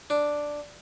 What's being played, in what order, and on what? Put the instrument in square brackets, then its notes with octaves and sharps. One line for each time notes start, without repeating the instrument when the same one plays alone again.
[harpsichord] D4